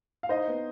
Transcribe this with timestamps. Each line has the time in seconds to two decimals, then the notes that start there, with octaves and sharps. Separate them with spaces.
0.23 F5
0.29 D#4 C5 D#5
0.48 B3